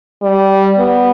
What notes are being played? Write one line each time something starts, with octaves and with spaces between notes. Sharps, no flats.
G3
B3